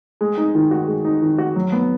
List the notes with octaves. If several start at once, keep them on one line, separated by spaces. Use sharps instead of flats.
G#3
D#4
D#3
F#4
G#3
D#4
D#3
F#4
F#3
B3